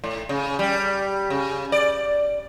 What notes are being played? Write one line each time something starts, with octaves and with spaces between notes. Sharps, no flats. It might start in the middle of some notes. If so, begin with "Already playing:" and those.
A2
C#3
G3
C#3
D5